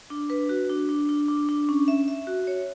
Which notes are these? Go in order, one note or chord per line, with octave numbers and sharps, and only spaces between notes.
D4
B4
F#4
D4
D4
D4
D4
D4
C#4
E5
E5
F#4
C#5